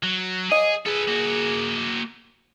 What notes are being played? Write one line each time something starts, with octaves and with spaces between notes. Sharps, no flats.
F#3
G#4 D#5
G#4 A4 B4
A#3 F#4